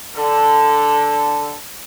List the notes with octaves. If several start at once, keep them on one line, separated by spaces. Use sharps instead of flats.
D3 A4